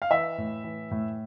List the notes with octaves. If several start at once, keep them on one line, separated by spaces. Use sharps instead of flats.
F5
E3 E5
A2
E3
A2